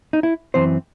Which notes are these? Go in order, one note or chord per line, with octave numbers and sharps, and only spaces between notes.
D#4
E4
F#2 E3 C4 C5